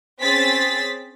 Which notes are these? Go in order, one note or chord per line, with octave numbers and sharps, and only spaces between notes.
C4 C#4 G#4 A6 B6